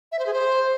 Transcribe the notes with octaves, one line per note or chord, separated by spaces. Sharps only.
E5
C5
G#4
C5